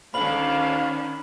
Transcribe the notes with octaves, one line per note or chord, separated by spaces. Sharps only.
D2 D#3 C#4 D4 F5 B5 F#7